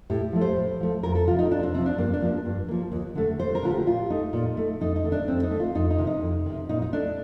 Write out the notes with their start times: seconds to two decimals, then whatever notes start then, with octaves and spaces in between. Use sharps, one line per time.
0.10 A2 G4
0.33 F3 A3
0.41 C5
0.56 A2
0.80 F3 A3
1.03 F2 A#4
1.15 A4
1.27 C3 F3 F4
1.39 D#4
1.51 F2 D4
1.63 C4
1.74 C3 F3 C4
1.86 D4
1.98 G2 A#3
2.13 D4
2.22 F3 A#3
2.45 G2
2.68 F3 A#3
2.92 D#2
3.15 D3 A3
3.39 D#2 C5
3.55 A#4
3.63 D3 A3 F4
3.71 G4
3.87 A#2 F4
4.10 A3 D#4
4.33 A#2
4.57 A3
4.81 F2 D#4
4.96 D#4
5.04 D#3 A3
5.12 D4
5.28 F2 C4
5.43 D#4
5.51 D#3 A3
5.60 F4
5.75 F2 D#4
5.91 D#4
5.98 C3 D#3
6.07 D#4
6.22 F2
6.46 C3 D#3
6.69 A#2 D#4
6.82 D#4
6.93 A3 D4